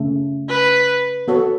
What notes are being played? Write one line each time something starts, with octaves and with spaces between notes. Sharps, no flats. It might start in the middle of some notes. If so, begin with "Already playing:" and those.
Already playing: C#3 A3
B4
B3 F#4 A4 C#5